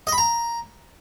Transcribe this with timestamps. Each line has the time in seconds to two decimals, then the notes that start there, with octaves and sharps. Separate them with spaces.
0.07 D#5
0.12 B5
0.18 A#5